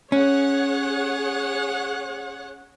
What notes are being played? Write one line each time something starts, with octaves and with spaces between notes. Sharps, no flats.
C#4 G#4 C#5 F#5